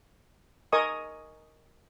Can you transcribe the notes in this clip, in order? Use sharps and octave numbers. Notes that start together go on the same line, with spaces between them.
A#4 D#5 G#5 C#6 D#6